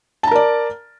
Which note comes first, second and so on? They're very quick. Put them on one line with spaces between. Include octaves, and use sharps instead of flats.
A5 A#5 A#4 D5